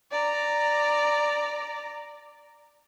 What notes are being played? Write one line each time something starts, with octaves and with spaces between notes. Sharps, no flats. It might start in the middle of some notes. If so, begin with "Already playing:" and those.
D5 A#5